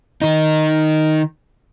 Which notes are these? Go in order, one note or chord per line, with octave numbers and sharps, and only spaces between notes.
D#3 D#4